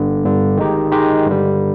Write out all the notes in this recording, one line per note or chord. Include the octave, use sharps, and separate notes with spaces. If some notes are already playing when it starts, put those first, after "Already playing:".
Already playing: G1 G2 D3
G1 G2 D3
D#3 G#3 D#4 G4
D#3 G#3 D#4 G4
G2 D3 G3